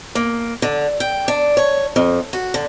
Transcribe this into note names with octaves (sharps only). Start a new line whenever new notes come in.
A#3
D3
G5
D4
C#5
F2
F#4
D3